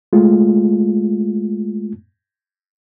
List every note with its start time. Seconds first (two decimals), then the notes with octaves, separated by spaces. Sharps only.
0.13 G#3 A3 F4